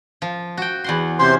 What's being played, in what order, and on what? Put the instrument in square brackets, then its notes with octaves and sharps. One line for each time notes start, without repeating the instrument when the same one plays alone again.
[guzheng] F3
F#4 G5
E2 F#5 C6
[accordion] C3 C5 C6 [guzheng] C#4